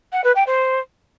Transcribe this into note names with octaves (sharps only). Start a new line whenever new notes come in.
F#5
B4
G5
C5